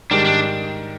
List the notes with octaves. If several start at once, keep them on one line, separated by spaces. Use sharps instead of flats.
G#2 D#3 G3 D4
D4